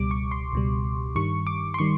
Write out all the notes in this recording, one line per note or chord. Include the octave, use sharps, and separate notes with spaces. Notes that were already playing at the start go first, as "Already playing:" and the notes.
Already playing: C#2 B2 G3 D6
C#6
C6
C#2 B2 G3
G2 D#3 G3 C#6
D6
C6
D#3 G3 C#6